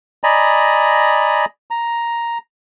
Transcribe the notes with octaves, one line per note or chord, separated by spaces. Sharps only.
D5 D#5 G#5 A#5 B5
A#5